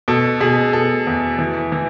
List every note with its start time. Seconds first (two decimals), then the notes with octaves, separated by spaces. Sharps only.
0.08 B2 A4
0.40 B2 G#4
0.73 B2 A4
1.07 E2
1.39 E3
1.72 E3